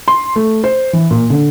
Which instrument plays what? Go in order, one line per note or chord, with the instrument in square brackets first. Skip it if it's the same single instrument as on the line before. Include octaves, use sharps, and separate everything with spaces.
[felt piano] C6
A3
C5
E3
A#2
D3